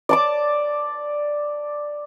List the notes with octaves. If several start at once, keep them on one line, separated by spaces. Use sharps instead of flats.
D5 A5 D6